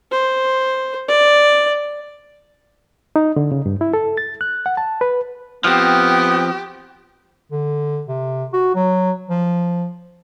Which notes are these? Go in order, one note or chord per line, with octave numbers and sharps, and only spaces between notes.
C5
D5
D#4
D3
C#3
G2
E4
A4
A6
F#6
F#5
A5
B4
F3 B3 C4 G4
D3
C3
F#4
F#3
F3